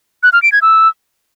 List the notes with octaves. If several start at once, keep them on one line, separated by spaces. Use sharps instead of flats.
F#6
F6
D7
G#6
E6